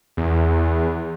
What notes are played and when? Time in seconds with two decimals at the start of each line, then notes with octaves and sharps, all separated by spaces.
0.17 E2